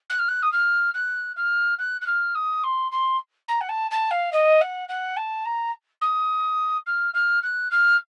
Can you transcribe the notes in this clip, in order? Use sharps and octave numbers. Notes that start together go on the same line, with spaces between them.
F#6
F6
F#6
D#6
F6
F#6
F6
F#6
F#6
F6
D#6
C6
C6
A#5
F#5
A5
A5
F5
D#5
F#5
F#5
A5
A#5
D#6
F6
F6
F#6
F6